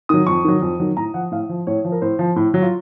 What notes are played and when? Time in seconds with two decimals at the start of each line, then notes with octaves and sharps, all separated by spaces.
0.09 D#3 F#3 D#6
0.27 F2 C#6
0.45 D#3 F#3
0.62 F2
0.80 D#3 F#3
0.97 A2 A#5
1.14 F3 F#5
1.32 A2 F5
1.49 F3
1.67 A2 C#5
1.85 F3
1.92 A#4
2.02 A2 C5
2.19 F3
2.36 A2
2.54 F#3
2.62 F4